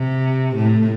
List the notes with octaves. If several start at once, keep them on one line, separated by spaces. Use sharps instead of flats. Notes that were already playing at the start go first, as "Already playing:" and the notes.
Already playing: C3
A2